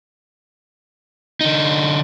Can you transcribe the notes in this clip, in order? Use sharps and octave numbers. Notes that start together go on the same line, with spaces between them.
D3 D#4